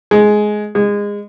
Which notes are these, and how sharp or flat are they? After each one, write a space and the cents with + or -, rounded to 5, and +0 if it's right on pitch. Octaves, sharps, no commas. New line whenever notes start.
G#3 +15
G#3 -20